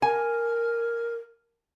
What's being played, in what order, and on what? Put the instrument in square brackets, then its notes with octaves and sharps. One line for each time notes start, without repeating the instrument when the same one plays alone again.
[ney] A#4 [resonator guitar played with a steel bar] G#5